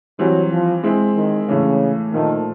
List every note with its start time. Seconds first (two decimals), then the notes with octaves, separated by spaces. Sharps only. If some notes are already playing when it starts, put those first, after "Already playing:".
0.19 E3 F#3 G3 C4
0.51 F3
0.83 G#3 C4 E4
1.16 D#3
1.48 A2 C#3 E3 A3 C#4
2.13 A#2 D#3 F3 A3